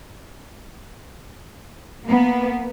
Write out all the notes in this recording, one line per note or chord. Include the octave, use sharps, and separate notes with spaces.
A#3 B3